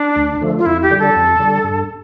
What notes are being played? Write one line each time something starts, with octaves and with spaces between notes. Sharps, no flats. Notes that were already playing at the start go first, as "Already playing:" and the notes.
Already playing: D4
D2
D3 F3 A3
F4
F2 E4
G4
D3 G3
A4
F2
D3 G3
G2